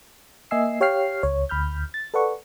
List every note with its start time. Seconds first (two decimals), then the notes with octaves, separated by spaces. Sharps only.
0.51 A#3 D#5 E5 G#5 E6 C7
0.81 G4 C#5 F5 G5 F6 C7
1.23 C#2 C#5
1.49 D2 B5 F6 G6
1.94 A6
2.14 A4 B4 D5 F#5 C#6